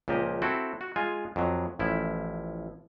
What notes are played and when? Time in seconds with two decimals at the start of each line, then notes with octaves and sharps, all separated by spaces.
0.08 C#2 A#2 F3 G4 D#5
0.42 C4 E4 F#4 A4
0.81 F#4
0.96 G#3 F4 G#5
1.36 F2 F#3
1.79 A1 F3 E4